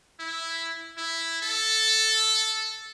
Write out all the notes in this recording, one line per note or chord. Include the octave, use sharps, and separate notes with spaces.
E4
E4
A4